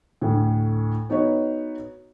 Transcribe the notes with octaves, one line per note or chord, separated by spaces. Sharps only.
D2 A2
B3 D#4 F#4 B4 C#5